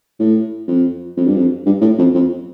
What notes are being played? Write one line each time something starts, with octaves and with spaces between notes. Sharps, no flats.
A2
F2
F2
G2
F2
G2
A2
F2
F2